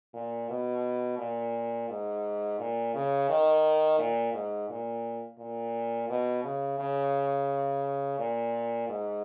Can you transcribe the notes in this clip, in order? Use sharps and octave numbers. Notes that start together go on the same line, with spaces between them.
A#2
B2
A#2
G#2
A#2
C#3
D#3
A#2
G#2
A#2
A#2
B2
C#3
C#3
A#2
G#2